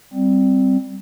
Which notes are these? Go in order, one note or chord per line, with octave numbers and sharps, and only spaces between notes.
G3 C4